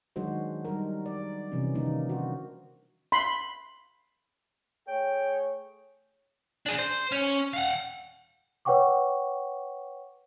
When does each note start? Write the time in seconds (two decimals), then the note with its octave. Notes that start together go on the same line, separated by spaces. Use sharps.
0.16 D#3 F#3 G#3 D4 F#4 C5
0.65 G3 D#4 A#4
1.06 D5
1.52 C3 E3 F3 C#4
1.75 D3 D#3 A#3 D4 D#4
2.09 F#4 C5
3.12 B5 C6
4.88 A3 G#4 C#5 G5
6.66 D4 G#4
6.79 C5
7.12 C#4
7.53 F5 F#5
8.65 B4 C#5 F#5 G5 C#6 D6